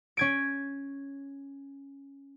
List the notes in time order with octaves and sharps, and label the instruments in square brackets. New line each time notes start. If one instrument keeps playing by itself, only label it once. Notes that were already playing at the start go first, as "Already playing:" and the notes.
[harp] C#4 G#6 D7